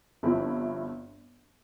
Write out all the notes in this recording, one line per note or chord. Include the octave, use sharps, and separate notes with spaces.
G1 G2 F3 C4 E4